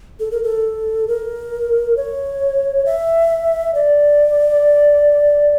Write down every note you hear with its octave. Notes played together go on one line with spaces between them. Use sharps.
A4
A#4
A4
A#4
C#5
E5
D5